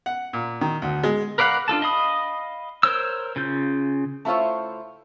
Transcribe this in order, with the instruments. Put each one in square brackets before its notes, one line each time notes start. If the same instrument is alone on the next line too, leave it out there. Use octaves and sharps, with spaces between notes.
[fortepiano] F#5
A#2
D#3
D2
G#3
[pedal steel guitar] A#4 B4 D5 F5 F#5
D4 F4 A4 A5
D#5 F5 B5 D#6
A#4 C5 C#5 E6
C#3 F4 G6
[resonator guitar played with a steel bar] A3 E4 F4 C5 C#5